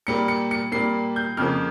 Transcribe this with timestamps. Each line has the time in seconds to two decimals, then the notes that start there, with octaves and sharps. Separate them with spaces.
0.07 A#2 G3 A#3 C#7
0.28 C#7
0.51 C#7
0.72 A#2 G3 A#3 C7
1.16 G6
1.37 F2 C#3 F3 A#3 F6